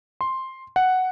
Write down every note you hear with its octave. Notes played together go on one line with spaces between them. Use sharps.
C6
F#5